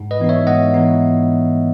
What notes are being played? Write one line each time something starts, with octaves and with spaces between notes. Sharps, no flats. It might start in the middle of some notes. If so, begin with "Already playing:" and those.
Already playing: G#2
B4 D#5
E3 B3 D#4
C#5 E5
G#2 D#5 F#5
E3 B3 D#4